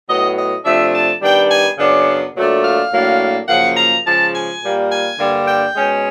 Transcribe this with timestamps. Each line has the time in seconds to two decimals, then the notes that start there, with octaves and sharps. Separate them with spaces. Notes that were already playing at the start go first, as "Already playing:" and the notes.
0.08 A2 F#3 B3 D#5
0.37 D#5
0.65 C3 F3 A3 D4 E5
0.94 A5
1.22 D#3 G3 B3 D4 G5
1.50 G#5
1.78 F#2 C#3 F#3 B3 D4
2.35 A#2 F#3 A3 D4
2.64 F5
2.92 A2 F#3 A#3 D4
3.48 F#2 C#3 F3 A#3 F#5
3.77 A#5
4.06 C#3 F3 G#3 A5
4.34 G#5
4.62 A#2 G3 A#3
4.91 G#5
5.19 G2 D3 G3 A#3 D4
5.47 G5
5.76 B2 G#3 C#4